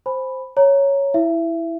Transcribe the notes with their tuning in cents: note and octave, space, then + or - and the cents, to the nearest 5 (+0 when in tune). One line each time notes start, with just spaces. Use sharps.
C5 +0 G#5 +0 B5 +0
C#5 +0 A#5 +0
E4 +0 E5 +25